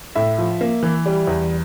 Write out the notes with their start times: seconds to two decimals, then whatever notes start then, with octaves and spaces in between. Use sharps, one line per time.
0.15 A2 E5
0.38 F3
0.61 A#3
0.83 E3
1.06 G3
1.27 E2